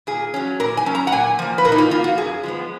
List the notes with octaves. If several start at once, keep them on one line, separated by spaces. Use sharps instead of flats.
A#2 G#4
F#3 C#4
A#2 A#4
G#5
F#3 C#4
A#5
F#5
A#2 G#5
F3 A#3
B4
A#2 A#4
D#4
F4
F3 A#3 F4
F#4
F#2 G#4
F3 G#3 B3